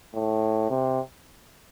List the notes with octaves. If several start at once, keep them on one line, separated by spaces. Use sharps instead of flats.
A2
C3